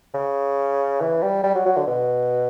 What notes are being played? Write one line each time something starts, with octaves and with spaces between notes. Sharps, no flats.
C#3
E3
G3
G3
F#3
F#3
D3
B2